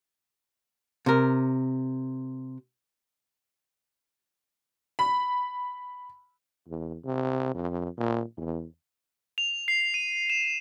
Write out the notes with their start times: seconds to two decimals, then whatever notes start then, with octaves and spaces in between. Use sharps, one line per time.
1.06 C3 A#4
4.99 B5
6.68 E2
7.05 C3
7.54 F2
7.98 A#2
8.37 E2
9.38 F7
9.68 C7
9.94 D#7
10.30 E7